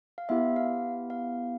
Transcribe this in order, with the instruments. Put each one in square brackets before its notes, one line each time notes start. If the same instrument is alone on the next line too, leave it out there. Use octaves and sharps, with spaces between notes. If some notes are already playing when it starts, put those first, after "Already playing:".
[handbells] F5
B3 E4 G4 E5
F5
F5